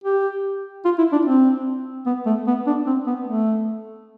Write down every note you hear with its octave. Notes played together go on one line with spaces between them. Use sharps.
G4
F4
E4
D4
C4
B3
A3
B3
D4
C4
B3
A3